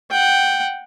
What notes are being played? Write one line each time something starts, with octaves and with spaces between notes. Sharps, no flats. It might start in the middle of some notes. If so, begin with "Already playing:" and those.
F#5 G5